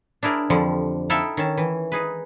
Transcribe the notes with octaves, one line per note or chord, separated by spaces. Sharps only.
D4 E4 G#4 A#4 D5
F2 D3 F3 G3
D#4 E4 A4 E5 F5 G5
D#3 C#4 A5
E3
D#4 G#4 B4